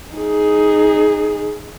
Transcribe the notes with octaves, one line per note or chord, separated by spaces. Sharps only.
D#4 G#4